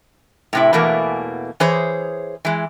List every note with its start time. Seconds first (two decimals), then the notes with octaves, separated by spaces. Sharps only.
0.53 A2 C3 E4
0.73 E2 B2 E3 A3 A#3
1.60 E3 G#4 C5 C#5
2.45 E3 G#3